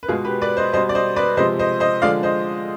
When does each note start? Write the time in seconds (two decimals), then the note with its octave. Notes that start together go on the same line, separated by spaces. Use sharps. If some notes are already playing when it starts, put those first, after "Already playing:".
0.03 B4
0.08 B2 G#3 F4 G#4
0.25 G4 B4
0.42 B4 D5
0.57 C5 D#5
0.73 B2 G3 C5 D#5
0.89 D5
0.95 C5 D#5
1.16 B4 D5
1.37 C3 F3 G#3 C5 D#5
1.59 C5 D#5
1.80 C5 D#5
2.02 D3 F3 G#3 D5 F5
2.23 C5 D#5